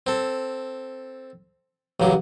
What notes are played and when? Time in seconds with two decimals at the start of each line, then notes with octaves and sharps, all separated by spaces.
0.07 C4 A4
2.00 A1 C#3 F#3 D6